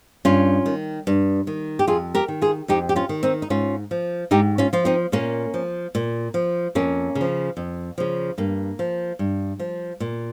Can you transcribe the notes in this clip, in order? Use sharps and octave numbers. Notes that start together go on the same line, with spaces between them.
G2 C#4 F4
D#3
G2
D#3
G4
F2 F4 G#4
G4 A#4
D#3
F4 G#4
F2 D#4 G4
G4
C#4 F4
D#3
C4 D#4
D#4
G#2 C#4 F4
F3
G#2 D#4 G4
C#4 F4
F3 F4
C4 D#4
A#2 A#3 C#4
F3
A#2
F3
F2 A#3 C#4
C#3
F3
F2
C#3 F3
G2 A#3
F3
G2
F3
A#2